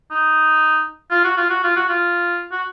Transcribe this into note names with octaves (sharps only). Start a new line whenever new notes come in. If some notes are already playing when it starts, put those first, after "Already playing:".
D#4
F4
F#4
F4
F#4
F4
F#4
F4
F#4